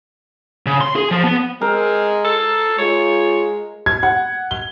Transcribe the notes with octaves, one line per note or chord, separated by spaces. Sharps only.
C#3
C6
G#4
F3
B3
G#3 C4 A#4
A4
G#3 F4 C#5
G#6
F#5
G7